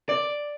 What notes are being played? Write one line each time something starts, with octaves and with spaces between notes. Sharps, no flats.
D5